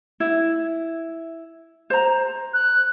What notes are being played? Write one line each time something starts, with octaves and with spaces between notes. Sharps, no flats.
E4
C5 A#5
F#6